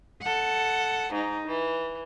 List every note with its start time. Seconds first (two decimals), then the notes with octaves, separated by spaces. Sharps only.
0.23 A4 F#5
1.13 G#2 D#4
1.47 E3